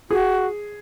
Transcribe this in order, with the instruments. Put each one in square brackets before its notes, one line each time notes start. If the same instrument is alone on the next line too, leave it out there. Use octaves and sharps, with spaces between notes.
[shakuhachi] F#4 [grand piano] G#4